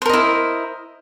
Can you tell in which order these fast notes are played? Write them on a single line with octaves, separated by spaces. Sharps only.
C5 A#4 D#5 E4